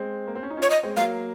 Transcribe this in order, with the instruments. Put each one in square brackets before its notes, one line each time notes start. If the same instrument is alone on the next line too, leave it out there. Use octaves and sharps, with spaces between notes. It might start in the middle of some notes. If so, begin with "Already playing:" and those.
Already playing: [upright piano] G#3 C4
A#3
C4
C#4
D#4
C#4 F4
[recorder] C#5
D#5
[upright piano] G#3 C4
[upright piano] F#3 A#3 [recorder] F5